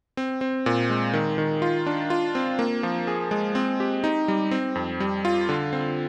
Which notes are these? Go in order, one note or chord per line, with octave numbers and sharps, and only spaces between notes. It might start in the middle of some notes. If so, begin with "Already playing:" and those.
C4
C4
A#2
G#3
D#3
D#3
F4
D4
F4
C4
A#3
F3
G#4
G#3
C4
G4
D#4
G3
C4
F2
G3
F4
D3
C4